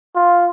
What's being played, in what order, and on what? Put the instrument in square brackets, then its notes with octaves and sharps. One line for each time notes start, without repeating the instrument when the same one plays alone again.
[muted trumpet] F4